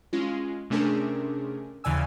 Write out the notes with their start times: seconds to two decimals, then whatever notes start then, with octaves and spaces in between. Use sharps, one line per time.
0.13 G#3 C#4 F4
0.70 C3 A3 C#4 D4 G#4 A#4
1.84 D#2 C#3 E3 D5 G#5 E6